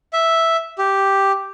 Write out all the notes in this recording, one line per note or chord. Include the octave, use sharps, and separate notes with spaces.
E5
G4